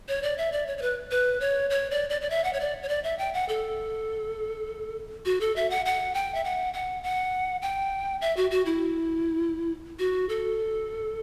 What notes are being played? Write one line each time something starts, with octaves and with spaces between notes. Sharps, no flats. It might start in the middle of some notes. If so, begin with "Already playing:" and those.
C#5
D5
E5
D5
C#5
C#5
B4
B4
C#5
C#5
D5
D5
D5
E5
F#5
C#5
D5
C#5
D5
E5
G5
F#5
A4
F#4
A4
E5
F#5
F#5
G5
E5
F#5
F#5
F#5
G5
E5
F#4
F#4
E4
F#4
A4